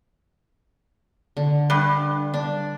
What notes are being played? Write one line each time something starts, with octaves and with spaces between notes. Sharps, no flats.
D3
G2
D4